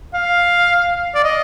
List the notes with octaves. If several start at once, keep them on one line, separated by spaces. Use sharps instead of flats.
F5
D5
D#5